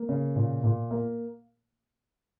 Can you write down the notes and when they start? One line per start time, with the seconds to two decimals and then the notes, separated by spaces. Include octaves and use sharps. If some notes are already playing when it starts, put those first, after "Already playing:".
Already playing: A#3
0.09 C#3
0.36 A#2
0.64 A#2
0.91 A#3